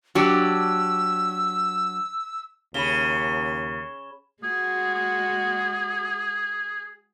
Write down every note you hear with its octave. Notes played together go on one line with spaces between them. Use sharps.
F#3 D4 G4 E6
D#2 C#3 B5 E7 G7
G#3 F#4 G#4
G#4